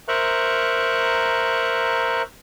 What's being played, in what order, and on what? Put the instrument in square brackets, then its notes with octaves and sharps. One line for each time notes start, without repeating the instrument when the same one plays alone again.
[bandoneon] A#4 C5 E5 A#5 C#6 F#6